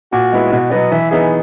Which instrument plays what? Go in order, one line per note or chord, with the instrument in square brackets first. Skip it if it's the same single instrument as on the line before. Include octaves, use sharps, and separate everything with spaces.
[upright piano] A#2 [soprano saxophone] F#4
[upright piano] G#3 B3 E4
[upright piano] B2 [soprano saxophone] F#4
[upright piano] F#3 B3 [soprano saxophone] D#5
[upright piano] E3 [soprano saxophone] E5
[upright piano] B3 D#4 G#4 [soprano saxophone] E5